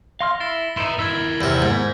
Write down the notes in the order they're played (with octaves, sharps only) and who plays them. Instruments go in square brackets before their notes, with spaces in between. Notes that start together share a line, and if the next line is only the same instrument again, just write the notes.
[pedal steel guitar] F5 C6 F6 [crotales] A#6
[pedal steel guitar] E4 [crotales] A6 C7 G7
[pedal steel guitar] D#4 E4 [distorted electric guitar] B4 C6
[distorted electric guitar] D#2 E4 [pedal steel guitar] A#4 E6 [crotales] G#6 B6
[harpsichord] E2 C3 [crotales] F6 G6
[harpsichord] G#2 [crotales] G6